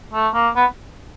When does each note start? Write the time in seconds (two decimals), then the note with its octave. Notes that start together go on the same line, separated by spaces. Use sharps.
0.13 A3
0.34 A#3
0.56 B3